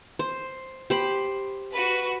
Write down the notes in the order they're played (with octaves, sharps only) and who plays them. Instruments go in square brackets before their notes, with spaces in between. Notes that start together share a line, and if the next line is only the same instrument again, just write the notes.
[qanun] C5
G4 C5 B5
[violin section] F#4 B4